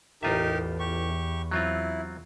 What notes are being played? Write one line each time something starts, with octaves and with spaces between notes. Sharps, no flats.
A1 E2 D#4 F4 G4 A#4 E5
G4 C#6
F#3 C4 E4 F4